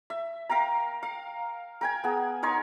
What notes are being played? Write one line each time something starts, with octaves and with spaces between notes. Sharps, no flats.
E5
A#4 F5 G5 A#5
F5
A#4 G5 G#5
B3 G#4
D#4 A#4 C#5 C6